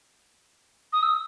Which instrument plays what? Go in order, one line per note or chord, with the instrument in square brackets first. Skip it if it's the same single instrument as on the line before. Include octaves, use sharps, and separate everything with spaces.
[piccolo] D#6
E6